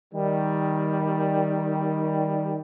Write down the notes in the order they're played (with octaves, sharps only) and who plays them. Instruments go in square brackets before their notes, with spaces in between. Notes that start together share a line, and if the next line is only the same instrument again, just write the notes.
[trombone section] D#3 G3